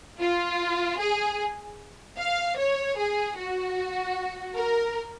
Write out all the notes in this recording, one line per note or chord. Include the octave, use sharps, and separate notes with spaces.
F4
G#4
F5
C#5
G#4
F#4
A#4